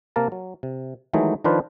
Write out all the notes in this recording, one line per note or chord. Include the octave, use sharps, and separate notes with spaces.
C3 A#3 A#4 A5
F#3
C3
D#3 E3 F#3 G#3 A3 D#4
D#3 F3 D4 F4 B4 C5